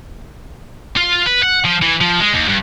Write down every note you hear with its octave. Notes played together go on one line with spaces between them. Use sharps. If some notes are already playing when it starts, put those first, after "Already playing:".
F4
B4
F#5
F3
E3
F3
G#3
D#2
G2